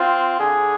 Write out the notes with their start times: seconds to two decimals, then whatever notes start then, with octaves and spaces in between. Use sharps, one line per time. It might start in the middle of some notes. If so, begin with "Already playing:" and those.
Already playing: C4 F4
0.39 D3 G#4